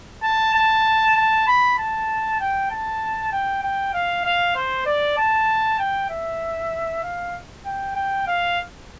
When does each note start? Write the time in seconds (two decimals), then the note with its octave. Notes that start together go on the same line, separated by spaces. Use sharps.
0.23 A5
0.54 A5
1.17 A5
1.47 B5
1.78 A5
2.40 G5
2.71 A5
3.32 G5
3.63 G5
3.93 F5
4.25 F5
4.56 C5
4.86 D5
5.18 A5
5.79 G5
6.10 E5
7.03 F5
7.65 G5
7.95 G5
8.27 F5